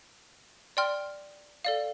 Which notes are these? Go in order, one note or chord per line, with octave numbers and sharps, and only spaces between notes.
D5 G5 C6 F6
A4 D5 F5